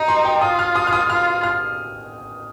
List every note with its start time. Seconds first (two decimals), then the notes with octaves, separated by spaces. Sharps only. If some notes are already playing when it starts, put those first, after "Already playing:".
Already playing: D#4 A#5
0.08 C6
0.25 G5
0.41 F4 D#6
0.59 F6
0.75 D#6
0.87 F6
0.93 D#6
1.10 F4 F6
1.43 F6